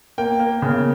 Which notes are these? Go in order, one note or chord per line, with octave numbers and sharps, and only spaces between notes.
A#3 G5
A#3
C#3